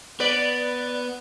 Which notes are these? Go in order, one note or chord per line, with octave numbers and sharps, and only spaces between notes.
B3 B4 D5